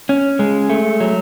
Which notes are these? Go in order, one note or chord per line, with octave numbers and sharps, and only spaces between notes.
C#4
G#3
A3
F#3